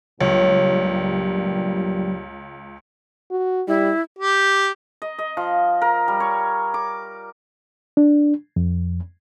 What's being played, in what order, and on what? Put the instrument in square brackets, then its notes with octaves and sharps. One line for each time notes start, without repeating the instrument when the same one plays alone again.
[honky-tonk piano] C#2 [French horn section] G2 A#2 G3 [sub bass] F#3 [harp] C#5
[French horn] F#4
[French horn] G3 [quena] E4
[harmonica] G4
[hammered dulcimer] D#5
D#5
F3
A#4
G3
C#5
D6
[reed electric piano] D4
F2